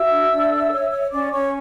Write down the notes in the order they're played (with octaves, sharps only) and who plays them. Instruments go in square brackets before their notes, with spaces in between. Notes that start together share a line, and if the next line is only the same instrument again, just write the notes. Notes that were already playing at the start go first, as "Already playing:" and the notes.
Already playing: [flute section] F#4 E5 E6
D4
D4
A4
C#5
C#5
C#4 D5 D6
C#4 C#5 C#6